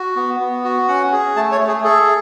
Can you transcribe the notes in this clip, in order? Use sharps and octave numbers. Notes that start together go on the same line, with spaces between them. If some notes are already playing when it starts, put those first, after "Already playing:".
Already playing: F#4
B3
B3
F#4
C#4 F#5
G#4
A3 A5
C#5
A3
G#4
G#4 A4